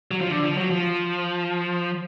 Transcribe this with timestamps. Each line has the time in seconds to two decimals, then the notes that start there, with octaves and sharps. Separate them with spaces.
0.11 F#3
0.21 F3
0.30 D3
0.44 F3
0.57 F#3
0.71 F3